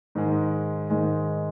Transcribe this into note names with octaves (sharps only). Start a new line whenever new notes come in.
G#2 D#3 G#3
G#2 D#3 G#3